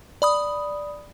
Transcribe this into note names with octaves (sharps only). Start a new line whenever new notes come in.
D5 B5 D#6